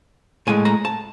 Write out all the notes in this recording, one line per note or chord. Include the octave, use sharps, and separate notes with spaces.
A2 E3 G#3 G#5
A#5
A5